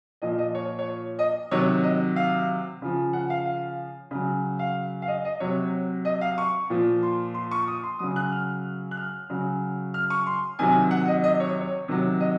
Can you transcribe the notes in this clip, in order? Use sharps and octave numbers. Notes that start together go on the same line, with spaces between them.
A#2 F3 D#5
D#5
C#5
C#5
D#5
C3 D#3 F#3 C#5
D#5
F5
C#3 F3
F#5
F5
F5
C#3 F#3
F5
F5
D#5
D#5
C3 F#3 C#5
D#5
F5
C#6
A#2 F3
C6
C6
C#6
D#6
C6
C#3 F#3 D#6
F#6
F6
F#6
F6
C#3 F#3
F6
C#6
C6
C3 D#3 F#3 G#5
F#5
D#5
D#5
C#5
C#5
C3 D#3 F#3
D#5